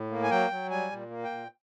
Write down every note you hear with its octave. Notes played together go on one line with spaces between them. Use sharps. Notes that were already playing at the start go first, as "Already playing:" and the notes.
Already playing: A2
A#3
G#5
F#3 G5
F#3
G3 G#5
A#2
A#3
G5
A#2